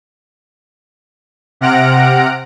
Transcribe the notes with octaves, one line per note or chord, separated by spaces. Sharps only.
C3 F#5 F6 A#6 D7